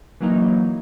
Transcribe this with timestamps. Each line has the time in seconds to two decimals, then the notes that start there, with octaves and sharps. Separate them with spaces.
0.21 E3 F#3 A#3 D#4